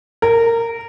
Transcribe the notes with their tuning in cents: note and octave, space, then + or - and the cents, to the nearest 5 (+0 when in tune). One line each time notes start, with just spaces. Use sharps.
A#4 -15